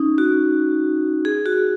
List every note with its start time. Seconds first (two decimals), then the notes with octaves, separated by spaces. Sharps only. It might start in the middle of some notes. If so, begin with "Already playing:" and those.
Already playing: C#4 D#4
0.18 F#4
1.25 G#4
1.46 F#4